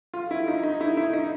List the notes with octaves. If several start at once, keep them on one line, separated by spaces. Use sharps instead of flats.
F4
E4
D#4
D#4
E4
E4
D#4